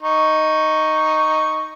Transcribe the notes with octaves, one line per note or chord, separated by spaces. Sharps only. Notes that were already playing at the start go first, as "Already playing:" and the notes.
D#4 C#6